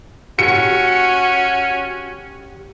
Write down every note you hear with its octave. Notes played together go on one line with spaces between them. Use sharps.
C#4 F#4 G4 C#7